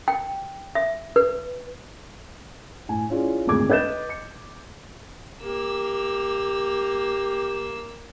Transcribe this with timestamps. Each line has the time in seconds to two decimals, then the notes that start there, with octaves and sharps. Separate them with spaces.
0.08 G5
0.75 E5
1.16 B4
2.88 A2 G#5
3.10 C#4 E4 F4 G#4 D5
3.47 G#1 D2 A#2 G#4 D6 G#6
3.70 B4 D#5 G6 A6 E7
4.09 C#7
5.43 A#3 G4 E6